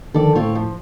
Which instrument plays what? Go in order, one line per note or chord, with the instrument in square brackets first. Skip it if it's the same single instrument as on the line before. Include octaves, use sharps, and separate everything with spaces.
[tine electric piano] D3 D#3 F3 [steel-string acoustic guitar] A4 D5
[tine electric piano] A2 [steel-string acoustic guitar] C4 F4 C#5
[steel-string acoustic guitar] F3